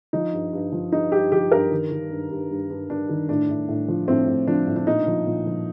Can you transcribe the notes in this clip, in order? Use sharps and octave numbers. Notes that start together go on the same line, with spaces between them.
F3 D#4
G2
G2
F3
G2 D#4
G2 G4
F3 G4
G2 A#4
D#3
D#3
G2
G2
G2
G2
G2 D4
D#3
A2 D4
A2
A2
F3
A2 C4
A2
F3 D4
A2
D4
A#2 D#4
F3
A#2
F3